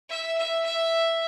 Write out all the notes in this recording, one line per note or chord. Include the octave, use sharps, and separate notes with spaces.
E5
E5
E5